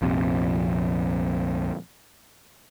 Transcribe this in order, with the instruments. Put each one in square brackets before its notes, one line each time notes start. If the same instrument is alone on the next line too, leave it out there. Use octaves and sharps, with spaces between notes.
[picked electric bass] A#1 F2 C3